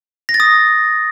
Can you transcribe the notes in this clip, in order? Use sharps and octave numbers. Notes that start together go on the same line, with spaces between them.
A#6
A6
D#6